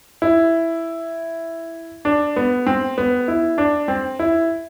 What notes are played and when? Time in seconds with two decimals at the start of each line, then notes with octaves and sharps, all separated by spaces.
0.22 E4
2.05 D4
2.36 B3
2.67 C4
2.98 B3
3.28 E4
3.58 D4
3.88 C4
4.19 E4